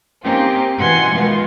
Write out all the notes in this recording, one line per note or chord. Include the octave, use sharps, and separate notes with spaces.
A#3 C4 C#4 D#4 F4 G4
B2 E3 F#5 G#5 C6 G#6
D#3 G#3 B3 F4